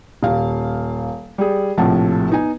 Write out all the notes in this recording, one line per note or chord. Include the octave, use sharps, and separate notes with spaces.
D#1 F5
G3 G#4
A#1 A2 C3 F3 F#5 A5
B3 D#4 G#5